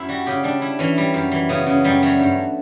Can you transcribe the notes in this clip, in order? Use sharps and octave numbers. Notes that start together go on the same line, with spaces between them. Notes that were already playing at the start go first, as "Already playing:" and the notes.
Already playing: F#2 E4
G3 F#4
C#3 G4
G3 D4
G3 E4
E3 C#4
G3
F#2
E3
C#3 B3
C#3
F#2 G3
F#3 A3
G2